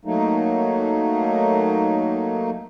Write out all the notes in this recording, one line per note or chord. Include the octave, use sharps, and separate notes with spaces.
F#3 A3 A#3 D#4